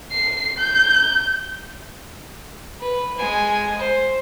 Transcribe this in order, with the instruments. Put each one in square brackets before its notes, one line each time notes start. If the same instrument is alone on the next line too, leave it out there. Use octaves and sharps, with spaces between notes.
[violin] C7
G6
[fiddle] B4
G#3 G#5
C5